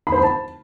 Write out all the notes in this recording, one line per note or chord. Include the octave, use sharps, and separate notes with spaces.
B5
C5
B5
A5